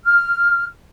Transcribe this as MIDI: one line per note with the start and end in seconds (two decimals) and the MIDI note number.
0.04 0.64 89